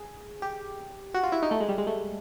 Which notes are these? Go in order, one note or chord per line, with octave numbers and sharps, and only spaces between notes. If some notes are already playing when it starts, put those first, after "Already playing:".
Already playing: G#4
G4
F#4
F4
E4
D#4
A3
G#3
G3
G#3
A3